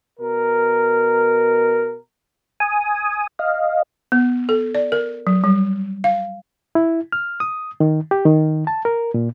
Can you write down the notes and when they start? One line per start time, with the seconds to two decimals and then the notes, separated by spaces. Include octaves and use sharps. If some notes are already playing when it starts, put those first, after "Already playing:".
0.19 B2 A#4
2.60 G#5 D#6
3.39 D#5 F5
4.12 B3
4.49 A4
4.75 D5
4.92 A#4
5.27 F#3
5.44 G3
6.04 F5
6.75 E4
7.12 F6
7.40 D#6
7.80 D#3
8.11 G4
8.26 D#3
8.67 A5
8.85 A#4
9.14 A#2